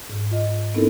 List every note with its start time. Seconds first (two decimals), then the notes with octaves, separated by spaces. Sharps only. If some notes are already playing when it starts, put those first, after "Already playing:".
0.09 G#2
0.31 F4 D#5
0.75 B3 C4 D#4 E4 A4 A#4